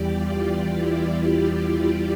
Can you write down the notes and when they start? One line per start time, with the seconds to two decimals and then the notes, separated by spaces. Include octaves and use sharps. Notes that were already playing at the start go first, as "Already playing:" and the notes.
Already playing: E2 E3 G3 G4 D5
0.10 F4
0.74 E4